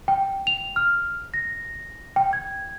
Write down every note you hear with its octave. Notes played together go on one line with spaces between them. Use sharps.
G5
F7
F6
A#6
G5
G#6